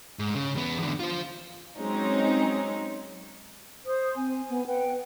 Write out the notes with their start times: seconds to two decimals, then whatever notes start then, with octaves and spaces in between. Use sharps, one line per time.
0.19 G#2
0.35 C#3
0.55 E2 B3
0.79 E2 D3
1.00 F4 C5
1.78 F#3 G#3 C4 C#4 D#4
3.86 C5 D#6
4.16 C4 G#5
4.49 B3
4.67 B4 F#5 G5